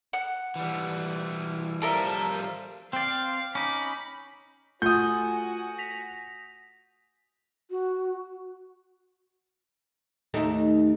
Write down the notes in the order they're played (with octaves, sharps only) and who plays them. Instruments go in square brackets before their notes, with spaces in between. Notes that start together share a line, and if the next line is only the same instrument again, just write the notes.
[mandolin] F#5
[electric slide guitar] E3 G3
[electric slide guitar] F3 G3 [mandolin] A4 A#4 E5
[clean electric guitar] C4 D5 [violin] F5 [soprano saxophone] G5
[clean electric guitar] C#4 D#4 [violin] B5 [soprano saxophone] D6
[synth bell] A3 F4 A4 [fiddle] F#4 G#5 [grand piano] D#6 G6
[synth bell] A#6 B6 F7
[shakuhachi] F#4
[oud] D#2 A3 D#4